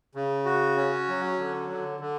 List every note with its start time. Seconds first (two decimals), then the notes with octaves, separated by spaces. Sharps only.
0.15 C#3
0.45 F#4
0.76 C#4
1.08 F#3
1.39 D3
1.70 D3
2.00 D3